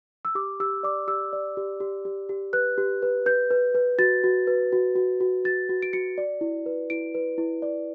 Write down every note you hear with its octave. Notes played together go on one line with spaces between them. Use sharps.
E6
G4 D6
G4 E6
D5 D6
G4 E6
D5
G4
G4
G4
G4
B4 F#6
G4
B4
B4 G6
B4
B4
F#4 A6
F#4
B4
F#4
F#4
F#4
F#4 A6
F#4
D7
F#4 C#7
D5
E4
B4
E4 D7
B4
E4
D5